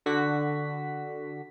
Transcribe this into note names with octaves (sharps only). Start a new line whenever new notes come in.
D3 F#4 B6